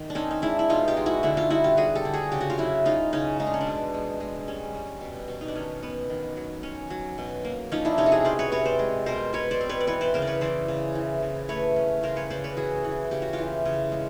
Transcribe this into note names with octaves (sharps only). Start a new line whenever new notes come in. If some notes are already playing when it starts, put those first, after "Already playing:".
Already playing: D#3
D4
C4 C#4 D#4
D#4
G#3 D4 E4
E4
B2 D#4 F4
F4 G4
G#3
E4 F#4
D3 E4 F#4
D#4 F4
G3 E4 F#4
F4 G4
G3 F#4 G#4
G4 A4
D3
F#4 G#4
C#3 G4
F#4
F4 G4
F#3 E4 F#4
C#4 D#4 F4
C#3 C#4 D#4
G#3 D#4
D4
C#4
D4
B2
G#3
G#3
G3 C#4
G3
B2
B2
D#4
D4
D#3 C#4
B3
D#3
F#3
C#4
F#3
B2
A#3
F3 C#4 D#4
D4 E4
C3 C#4 D#4
A4
F#4 G#4
C#4 C5 D5
B4 C#5
C3 B4 C#5
C5 D5
G#3
B2 A#4 C5
B2 B4 C#5
C5 D5
C4
B4 C#5
D5
E3 B4 C#5
C5 D5
C#3 A#4 C5
D5
B4 C#5
E3 C5 D5
C#3
E3
E3
A3 B4 C#5
C#4
C#3 A#4 C5
B4 C#5
C#3 C5 D5
B4 C#5
E3 F#4 G#4
E3
C#3 G4
F#4
F4 G4
E3
C#3
G#3